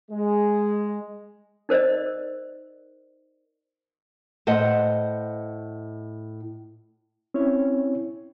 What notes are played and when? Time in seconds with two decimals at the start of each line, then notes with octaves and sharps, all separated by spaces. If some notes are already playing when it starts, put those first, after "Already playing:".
0.10 G#3
1.69 D#4 A#4 C5 D5 D#5
2.06 A#4
4.47 A2 C5 D#5 F#5
7.34 C4 C#4 E4 C#5